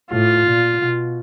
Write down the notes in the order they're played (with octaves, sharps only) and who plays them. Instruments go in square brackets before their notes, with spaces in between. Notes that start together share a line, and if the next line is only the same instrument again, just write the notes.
[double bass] A2 [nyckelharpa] F4
[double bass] A#2
B2